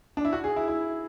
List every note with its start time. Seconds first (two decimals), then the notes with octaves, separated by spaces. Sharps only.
0.17 D4
0.25 E4
0.33 F#4
0.44 G#4
0.56 E4
0.68 E4